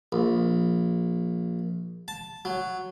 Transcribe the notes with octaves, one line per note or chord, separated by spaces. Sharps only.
A#1
A5
F#3